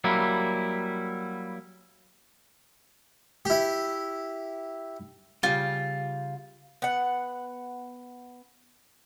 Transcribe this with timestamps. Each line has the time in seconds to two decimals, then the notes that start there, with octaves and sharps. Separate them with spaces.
0.04 F#3 G3 A#3 E4
3.45 E4 G4
5.43 C#3 G3 F4
6.82 B3 F#5